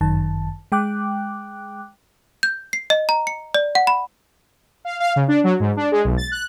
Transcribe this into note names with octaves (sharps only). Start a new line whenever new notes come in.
G1 F#2 D#3 A5
G#3 G5 D6 F#6
G6
C7
D#5
A#5
C#7
D5
F#5
B5
F5
F5
C#3
D4
F#3
G#2
D4
G#3
B1
A6
F#6